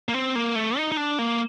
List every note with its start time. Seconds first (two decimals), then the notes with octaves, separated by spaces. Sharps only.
0.09 A#3
0.14 C4
0.35 A#3
0.55 A3
0.77 D#4
0.92 D#4
0.97 D4
1.19 A#3